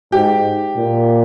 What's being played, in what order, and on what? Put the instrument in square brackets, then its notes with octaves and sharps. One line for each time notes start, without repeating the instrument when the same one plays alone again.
[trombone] G#2 [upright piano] G4
[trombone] A#2